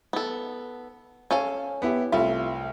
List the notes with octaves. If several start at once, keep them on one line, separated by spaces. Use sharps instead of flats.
B3 A4
C#4 A4 F5 G#5
B3 E4 G4
C2 A3 F4 E5